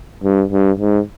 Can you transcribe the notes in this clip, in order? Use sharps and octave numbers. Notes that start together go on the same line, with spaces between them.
G2
G2
G#2